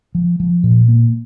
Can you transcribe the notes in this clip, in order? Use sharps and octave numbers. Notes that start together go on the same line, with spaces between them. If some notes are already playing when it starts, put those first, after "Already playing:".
F3
F3
A#2
A#3